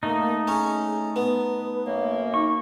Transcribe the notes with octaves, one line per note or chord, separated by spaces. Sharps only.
A3 A#3 D#4
C#4 G#4 C#5
B3 B4
F#2 A#3 C#5
D#4 C#6